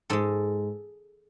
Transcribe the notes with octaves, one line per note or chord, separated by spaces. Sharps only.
G#2 G#3 A4